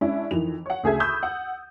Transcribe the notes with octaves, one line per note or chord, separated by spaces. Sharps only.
G#3 C#4 D4 E4
F2 D#3 E3 F7
C#5 F#5
D2 C#3 G#4 A4 E5 G#6
B5 C#6 D#6 E6 G6
F#5